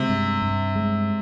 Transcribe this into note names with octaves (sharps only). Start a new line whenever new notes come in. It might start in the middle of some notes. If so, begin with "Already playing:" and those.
Already playing: C3 G#3
G2
G2
G#3